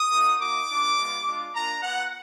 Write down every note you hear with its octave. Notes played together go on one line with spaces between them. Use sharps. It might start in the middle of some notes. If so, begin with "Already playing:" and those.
Already playing: D#6
A#3 D#4 F#4
A#3 D#4 F#4 D6
A#3 D4 F4
G#3 B3 F4
G#3 D4 F4
A#3 D4 F4 A#5
B3 F4 F#5